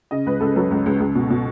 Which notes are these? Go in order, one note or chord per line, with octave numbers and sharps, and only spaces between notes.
C#3 D#5
C#2 B4
C#2 A4
F#3 A4
C#2
C#2
C#2
B2
B2